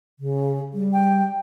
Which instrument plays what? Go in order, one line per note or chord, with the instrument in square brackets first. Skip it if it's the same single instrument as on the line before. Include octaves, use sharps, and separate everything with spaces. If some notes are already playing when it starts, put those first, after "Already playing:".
[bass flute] C#3
G3
[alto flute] G5